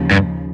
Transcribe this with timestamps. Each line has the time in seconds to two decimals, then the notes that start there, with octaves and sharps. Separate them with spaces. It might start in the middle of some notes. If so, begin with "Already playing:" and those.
Already playing: D#2 C#3 F3
0.11 G2